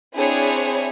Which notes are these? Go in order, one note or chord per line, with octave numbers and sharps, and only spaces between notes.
C4 D4 E4 G#4 C#5